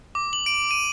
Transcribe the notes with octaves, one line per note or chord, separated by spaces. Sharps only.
D6
F#7
D7
D#7